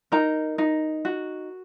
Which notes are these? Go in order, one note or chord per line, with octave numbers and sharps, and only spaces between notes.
D#4 A#4 A#5
D#4
F#4